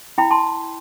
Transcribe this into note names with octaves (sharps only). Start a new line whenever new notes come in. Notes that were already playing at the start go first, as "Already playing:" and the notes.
E4 G5 B5
A5 C6